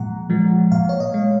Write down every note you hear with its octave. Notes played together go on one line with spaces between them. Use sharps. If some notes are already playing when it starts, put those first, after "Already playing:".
Already playing: A#2 F3 G#3 F#5 A#5
F3 G#3
A#2 F5
C#5
D#5
G#3